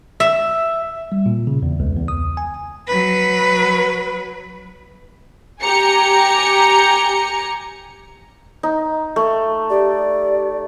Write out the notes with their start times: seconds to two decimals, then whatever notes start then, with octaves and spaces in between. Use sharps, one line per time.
0.20 E5
1.12 G3
1.26 A#2
1.47 C#3
1.63 E2
1.80 C#2
1.97 E2
2.08 D#6
2.37 G#5
2.87 F#3 B4
5.63 G4 G#5 A#5 C#7
8.63 D#4
9.16 A3
9.70 G4 D5